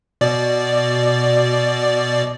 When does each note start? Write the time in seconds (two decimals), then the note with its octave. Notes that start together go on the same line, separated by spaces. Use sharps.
0.21 B2 D5